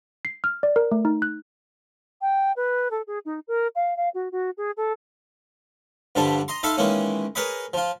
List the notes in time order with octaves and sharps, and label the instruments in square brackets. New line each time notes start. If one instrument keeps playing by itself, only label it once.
[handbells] C7
F6
D5
A#4
A3
D#4
F#6
[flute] G5
B4
A4
G#4
D#4
A#4
F5
F5
F#4
F#4
G#4
A4
[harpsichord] G2 D3 F3 G3 D4
D#5 A#5 C6
D#4 A4 E5 F5 B5 C6
D#3 E3 G#3 A#3 C#4
G#4 A#4 B4 C#5 D#5 B5
F3 F4